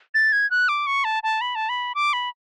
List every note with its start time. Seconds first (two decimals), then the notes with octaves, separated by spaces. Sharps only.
0.14 A6
0.32 G#6
0.51 F#6
0.69 D6
0.87 C#6
1.04 A5
1.23 A5
1.41 B5
1.55 A5
1.69 B5
1.95 D6
2.13 B5